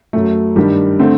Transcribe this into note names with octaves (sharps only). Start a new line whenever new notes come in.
F#2 F#3 A3
G2 D#3 G3 D4 G4
D3 A3 C4